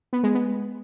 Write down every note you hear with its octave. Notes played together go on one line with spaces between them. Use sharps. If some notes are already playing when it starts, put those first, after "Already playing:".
B3
G#3
B3